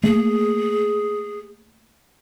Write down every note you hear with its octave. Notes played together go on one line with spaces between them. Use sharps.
A3 A#3 G#4